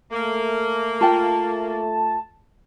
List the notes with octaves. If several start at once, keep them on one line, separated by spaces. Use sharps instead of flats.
A3 A#3
F4 G5 A5